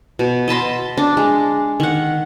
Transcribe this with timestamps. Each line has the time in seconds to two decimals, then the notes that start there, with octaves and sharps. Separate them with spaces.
0.19 B2
0.48 D#5 A5 B5 C6
0.97 D4
1.17 G#3
1.80 D#3 F#5